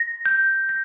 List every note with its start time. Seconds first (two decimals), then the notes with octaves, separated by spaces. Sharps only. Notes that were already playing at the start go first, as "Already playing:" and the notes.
Already playing: A#6
0.26 G6
0.69 A#6